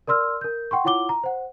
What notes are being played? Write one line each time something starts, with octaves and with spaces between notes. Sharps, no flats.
A#4 D5 C6 E6 F6
A#4 G6
F#5 G5 C6 C#6
E4 F4 C#5 F#5 D6 G7
A#5
C5 F#5